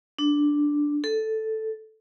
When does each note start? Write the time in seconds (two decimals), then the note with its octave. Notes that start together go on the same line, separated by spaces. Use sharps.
0.19 D4
1.04 A4